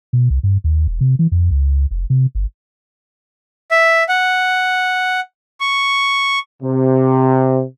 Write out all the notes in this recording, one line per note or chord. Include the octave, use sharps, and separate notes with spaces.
B2
C2
G2
D#2
E1
C3
E3
F2
C#2
F1
C3
G1
E5
F#5
C#6
C3